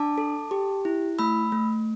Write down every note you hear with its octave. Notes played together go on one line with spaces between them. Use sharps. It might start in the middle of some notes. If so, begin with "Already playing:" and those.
Already playing: D4 A5 D6
A4
G4
E4
A3 B5 E6
A3